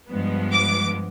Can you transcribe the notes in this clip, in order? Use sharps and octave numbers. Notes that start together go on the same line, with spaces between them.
G2 F3 G#3 B3
D6